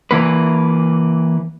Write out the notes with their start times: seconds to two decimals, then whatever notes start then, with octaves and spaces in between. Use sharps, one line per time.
0.11 E3 A#3 B4